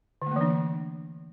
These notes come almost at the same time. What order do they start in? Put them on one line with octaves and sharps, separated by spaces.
D3 A3 A#3 E3 D4